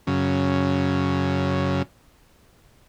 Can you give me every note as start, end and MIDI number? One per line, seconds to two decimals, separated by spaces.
0.07 1.82 42
0.07 1.82 49